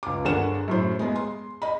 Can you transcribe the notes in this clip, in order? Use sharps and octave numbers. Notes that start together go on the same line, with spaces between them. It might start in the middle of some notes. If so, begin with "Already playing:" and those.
C#2 D6
G1 D3 G#4 A#4 F#5 E7
F#2 A2 C5
G#3 B3 G#4
C6
D#5 B5